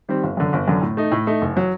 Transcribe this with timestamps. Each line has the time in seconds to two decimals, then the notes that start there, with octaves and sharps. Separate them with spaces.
0.09 D#3 G3 C4
0.23 G1
0.37 F#2 D3
0.53 G1
0.68 F#2 D3
0.82 A2
0.97 A3 D#4
1.12 A2
1.27 A3 D#4
1.42 F#1
1.57 F#3